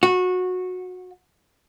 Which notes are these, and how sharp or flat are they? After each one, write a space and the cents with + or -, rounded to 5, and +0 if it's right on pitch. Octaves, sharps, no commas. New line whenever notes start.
F#4 -20